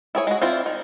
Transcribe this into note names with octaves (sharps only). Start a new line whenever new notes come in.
E4 G#4 C#5
G#3 F#4
C4 E4 F4 C5 D5
D#3